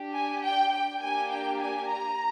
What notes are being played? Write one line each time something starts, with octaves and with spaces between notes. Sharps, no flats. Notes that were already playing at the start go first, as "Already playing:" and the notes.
Already playing: D4 G4
G#5
G5
G5
A#3 D4 G4 G#5
G5
G#5
A#5